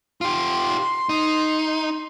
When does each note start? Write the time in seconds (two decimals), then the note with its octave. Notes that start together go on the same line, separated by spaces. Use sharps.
0.21 F4 G4 C6
1.09 D#4